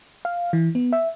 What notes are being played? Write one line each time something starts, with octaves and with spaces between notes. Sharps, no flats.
F5
E3
B3
E5